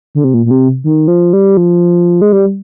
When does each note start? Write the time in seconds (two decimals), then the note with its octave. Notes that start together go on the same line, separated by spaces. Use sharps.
0.15 D3
0.24 C3
0.34 A#2
0.46 A#2
0.51 C3
0.84 D#3
1.08 F3
1.33 G3
1.57 F3
2.21 G#3
2.32 G3